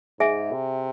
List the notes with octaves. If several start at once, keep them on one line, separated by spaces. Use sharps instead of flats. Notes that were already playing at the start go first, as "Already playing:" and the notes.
G#2 G#4 E5 G#5
C3